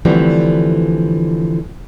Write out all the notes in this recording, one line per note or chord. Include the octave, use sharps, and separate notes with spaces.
D3 E3 F3 G3 A3 C4